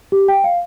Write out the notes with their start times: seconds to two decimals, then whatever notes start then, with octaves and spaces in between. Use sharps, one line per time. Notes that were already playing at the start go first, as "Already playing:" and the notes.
0.12 G4
0.28 G5
0.44 F5